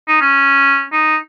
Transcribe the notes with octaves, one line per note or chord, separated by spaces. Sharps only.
D#4
C#4
D#4